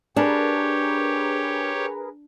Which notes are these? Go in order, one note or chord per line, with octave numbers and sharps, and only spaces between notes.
D4 G4 G#4 A#4 B4 C#5